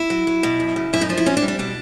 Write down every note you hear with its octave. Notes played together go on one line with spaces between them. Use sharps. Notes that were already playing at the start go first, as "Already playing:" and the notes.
Already playing: E4
F#3
F#3
B2
F#2
C#3
F#2 E4
D#4
F3 D4
E4
C4 C#4
D4
G3
D4
B2 D4